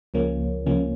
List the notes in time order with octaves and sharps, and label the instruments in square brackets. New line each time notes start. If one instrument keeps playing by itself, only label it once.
[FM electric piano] C#2 C#3 F3 A#3 C#4
C#2 C#3 F3 A#3 C#4